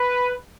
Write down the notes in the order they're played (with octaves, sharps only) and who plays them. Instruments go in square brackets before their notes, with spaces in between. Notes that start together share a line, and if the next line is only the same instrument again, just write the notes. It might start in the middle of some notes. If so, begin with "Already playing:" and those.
Already playing: [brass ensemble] B4